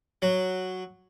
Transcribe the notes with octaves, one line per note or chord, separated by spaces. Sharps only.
F#3